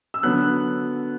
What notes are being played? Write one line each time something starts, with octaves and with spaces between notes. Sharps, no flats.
E6
D3 F#3 B3 F#6